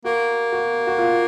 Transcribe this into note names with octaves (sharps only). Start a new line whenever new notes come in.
A#3 F#4
F#4
F#4
F4